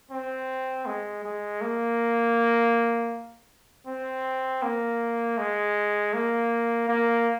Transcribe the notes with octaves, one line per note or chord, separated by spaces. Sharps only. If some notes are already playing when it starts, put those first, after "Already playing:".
C4
G#3
G#3
A#3
C4
A#3
G#3
A#3
A#3